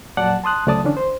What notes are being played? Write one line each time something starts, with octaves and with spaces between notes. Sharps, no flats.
F2 A#2 F#3 D5 F#5 A5
A5 C6 D#6 F#6
C#2 F#3 A3 D5 A5 D#6
D3 E3 C#4 D4
C5